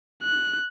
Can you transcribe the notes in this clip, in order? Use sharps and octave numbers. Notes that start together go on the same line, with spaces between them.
F#6